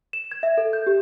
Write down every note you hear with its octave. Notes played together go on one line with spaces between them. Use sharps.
E7
G#6
E5
A4
G6
G4